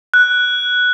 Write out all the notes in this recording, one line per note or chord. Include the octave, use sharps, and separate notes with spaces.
F#6